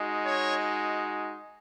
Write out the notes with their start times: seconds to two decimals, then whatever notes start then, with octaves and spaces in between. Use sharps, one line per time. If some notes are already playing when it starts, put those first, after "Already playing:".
Already playing: G#3 D#4 F#4
0.25 C#5